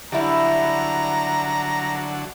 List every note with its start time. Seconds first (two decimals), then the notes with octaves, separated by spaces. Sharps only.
0.12 D3 F#3 G3 E4 A#5